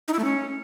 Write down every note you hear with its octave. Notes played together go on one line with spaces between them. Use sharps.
D#4
E4
A3
C#4